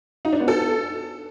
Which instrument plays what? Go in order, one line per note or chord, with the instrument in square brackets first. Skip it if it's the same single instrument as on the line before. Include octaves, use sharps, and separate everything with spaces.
[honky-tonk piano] D#4
D4
B3
A4